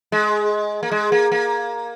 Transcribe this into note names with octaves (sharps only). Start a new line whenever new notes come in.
G#3
A#3
G#3
A#3
A#3